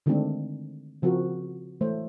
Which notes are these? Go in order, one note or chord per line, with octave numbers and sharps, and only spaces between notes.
D3 D#3 G#3 A3 C4 D4
C#3 F3 C4 F#4 A#4
E3 G#3 A3 C5 C#5